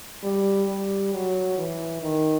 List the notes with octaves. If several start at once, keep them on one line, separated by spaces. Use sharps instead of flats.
G3
G3
F#3
E3
D#3